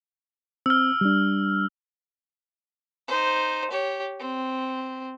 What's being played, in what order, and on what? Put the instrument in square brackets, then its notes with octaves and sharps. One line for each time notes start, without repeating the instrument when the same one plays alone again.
[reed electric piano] C4 [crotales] E6 F6
[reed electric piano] G3 D4
[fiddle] D#4 C5
G4 C#5
C4